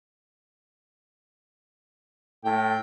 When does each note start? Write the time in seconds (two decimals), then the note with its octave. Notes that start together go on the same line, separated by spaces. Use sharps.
2.44 A2 G5